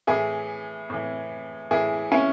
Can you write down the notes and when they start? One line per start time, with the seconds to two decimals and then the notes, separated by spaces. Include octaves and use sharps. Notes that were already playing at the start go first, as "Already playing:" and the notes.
0.07 A2 E3 E4 G#4
0.90 A2 E3
1.71 A2 E3 E4 G#4
2.12 C#4 E4